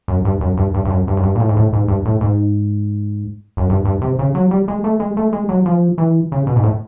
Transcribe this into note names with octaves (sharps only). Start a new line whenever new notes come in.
F#2
G2
F#2
G2
G2
G2
F#2
G2
F#2
G2
A#2
A2
G#2
A2
G#2
G2
A2
G#2
F#2
G2
G2
C3
C#3
F#3
G3
G#3
A3
G#3
A3
G#3
F#3
F3
E3
C#3
B2
G#2
A2